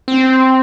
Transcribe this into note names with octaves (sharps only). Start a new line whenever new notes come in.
C4